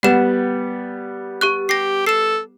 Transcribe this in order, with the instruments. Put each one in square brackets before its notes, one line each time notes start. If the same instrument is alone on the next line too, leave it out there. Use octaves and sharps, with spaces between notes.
[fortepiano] G3 B3 [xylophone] F#5 E7
[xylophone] G4 C#6 F#6
[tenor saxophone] G4 [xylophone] A#6 C7
[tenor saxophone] A4 [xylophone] C7 E7